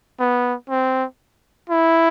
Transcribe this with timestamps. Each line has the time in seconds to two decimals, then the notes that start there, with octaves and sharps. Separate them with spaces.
0.20 B3
0.70 C4
1.70 E4